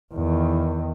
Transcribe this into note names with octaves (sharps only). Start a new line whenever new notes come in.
E2 D#3